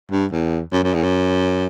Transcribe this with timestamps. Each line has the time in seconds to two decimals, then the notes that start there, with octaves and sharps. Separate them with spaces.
0.11 G2
0.32 E2
0.72 F#2
0.83 F#2
0.94 E2
1.03 F#2